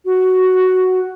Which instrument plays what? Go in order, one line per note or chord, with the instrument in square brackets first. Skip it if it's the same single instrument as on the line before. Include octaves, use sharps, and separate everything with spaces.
[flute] F#4